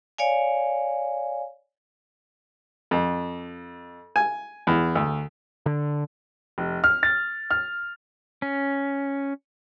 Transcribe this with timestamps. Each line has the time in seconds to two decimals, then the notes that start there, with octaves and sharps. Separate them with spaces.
0.18 C#5 D5 F5 G#5
2.91 F2
4.16 G#5
4.67 E2
4.95 D2
5.66 D3
6.58 F1
6.84 F6
7.03 A6
7.51 F6
8.42 C#4